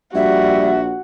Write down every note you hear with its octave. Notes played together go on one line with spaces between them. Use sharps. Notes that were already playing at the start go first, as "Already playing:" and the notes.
A#1 G3 F#4 E5